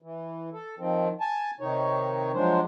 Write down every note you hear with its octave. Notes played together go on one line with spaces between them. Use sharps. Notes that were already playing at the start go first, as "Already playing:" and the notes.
E3
A4
D#3 F3 C4
G#5 A5
C3 D#3 D#4 C#5
F3 F#3 G#3 D4 C5